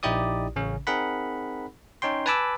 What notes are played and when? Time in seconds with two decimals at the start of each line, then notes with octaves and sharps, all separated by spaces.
0.03 A#1 D#4 E4 G4 D5 D#6
0.56 A1 C#3 C#4
0.87 C4 D#4 G#4 A#4 F#5 B5
2.02 C#4 D#4 C#5 G5 C6
2.26 B4 G#5 A5 B5 D6 E6